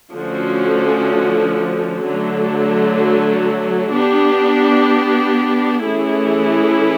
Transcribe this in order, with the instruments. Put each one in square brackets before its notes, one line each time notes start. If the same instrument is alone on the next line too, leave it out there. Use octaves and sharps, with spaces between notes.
[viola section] D3 F3 A3 C#4 F#4
D3 F#3 A3
B3 D4 G4
E3 A3 C#4 E4 G#4